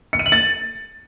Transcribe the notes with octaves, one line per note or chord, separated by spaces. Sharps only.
C#7
D#7
F#7
A6